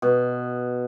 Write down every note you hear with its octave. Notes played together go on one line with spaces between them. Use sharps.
B2